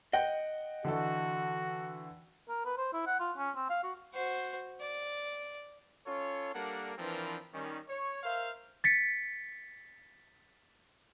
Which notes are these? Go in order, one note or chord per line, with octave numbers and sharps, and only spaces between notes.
D#5 F#5 G5
D3 E3 F#4 A4
A#4
B4
C5
E4
F#5
F4
C#4
C4
F5
F#4
F#4 C5
D5
C#4 F4 A4 C#5
G3 A#3 D4 A4 A#4 F#5
E3 F3 C4 D4 A#4 B4
D#3 G3 C#4
C#5
A#4 C5 E5 F5
A6 B6 C#7